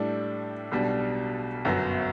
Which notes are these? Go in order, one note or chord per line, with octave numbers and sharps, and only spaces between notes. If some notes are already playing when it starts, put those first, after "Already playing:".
Already playing: A2 G3 D4 A4
B1 B2 G3 D4
G1 F#2 F#3 B3 F#4